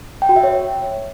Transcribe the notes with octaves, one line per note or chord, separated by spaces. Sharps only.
G5
F#4
E5
C#5